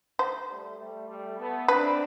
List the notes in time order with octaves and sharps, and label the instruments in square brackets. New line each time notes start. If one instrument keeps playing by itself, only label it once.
[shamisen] C5
[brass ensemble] G3 A3
G3 A3
G3 A3
A3 B3
[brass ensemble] C4 D4 [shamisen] B4